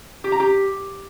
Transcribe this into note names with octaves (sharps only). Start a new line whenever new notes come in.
G4
A#5
G4